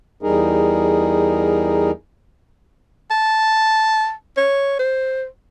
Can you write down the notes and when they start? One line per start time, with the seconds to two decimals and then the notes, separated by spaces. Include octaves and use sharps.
0.23 E2 G3 D#4 G#4 A#4
3.11 A5
4.37 C#5
4.79 C5